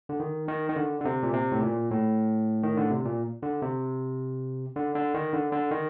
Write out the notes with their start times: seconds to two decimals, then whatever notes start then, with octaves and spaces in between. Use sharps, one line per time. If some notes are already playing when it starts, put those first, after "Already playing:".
0.09 D3
0.20 D#3
0.48 D#3
0.70 D#3
0.76 D3
1.00 D3
1.05 C3
1.23 A#2
1.33 C3
1.52 A2
1.62 A#2
1.91 A2
2.63 D#3
2.77 D3
2.91 C3
3.05 A#2
3.43 D3
3.62 C3
4.76 D3
4.95 D3
5.14 D#3
5.33 D3
5.52 D3
5.71 D#3